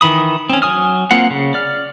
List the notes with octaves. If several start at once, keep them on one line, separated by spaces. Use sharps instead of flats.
D#3 E3 B5 D#6
C4 C#4
F#3 G#5 D#6 F6
A#3 C4 F4 F#5
C#3
D5 F6